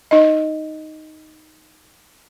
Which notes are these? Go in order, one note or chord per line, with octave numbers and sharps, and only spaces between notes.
D#4 D#5